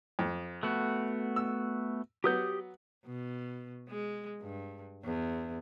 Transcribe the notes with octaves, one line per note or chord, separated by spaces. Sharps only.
F2
A3 B3 F#4
E6
F#3 B3 G4 D#6 G6
B2
G#3
G2
E2